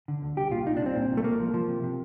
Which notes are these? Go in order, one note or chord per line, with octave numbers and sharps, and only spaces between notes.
D3
D2
C2 G4
A#2 F4
C2 D#4
D4
C2 C4
A#2
C2
A3
C2 A#3
F3
F3
C3
C3